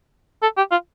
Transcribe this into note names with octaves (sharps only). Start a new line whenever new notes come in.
A4
G4
F4